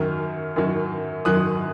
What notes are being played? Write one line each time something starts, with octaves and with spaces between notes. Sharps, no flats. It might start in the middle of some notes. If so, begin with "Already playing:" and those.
Already playing: F#2 D#3 F#3 F6
F#2 D#3 F#3
F#2 D#3 F#3 D#6 F#6